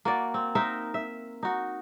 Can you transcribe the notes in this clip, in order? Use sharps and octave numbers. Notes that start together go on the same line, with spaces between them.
A#3 F#4 D5
C4
D#4 A#4 C5 E5
E5
D#4 F#4